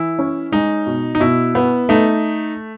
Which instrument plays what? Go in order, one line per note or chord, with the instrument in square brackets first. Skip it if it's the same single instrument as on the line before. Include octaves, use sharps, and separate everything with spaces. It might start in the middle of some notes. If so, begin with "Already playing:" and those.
Already playing: [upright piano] E3 [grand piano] E4
[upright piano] C#4
[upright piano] G#3 [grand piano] D#4
[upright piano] B2
[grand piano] D#4
[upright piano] B2 [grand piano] E4
[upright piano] B3
[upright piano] A3 [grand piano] D#4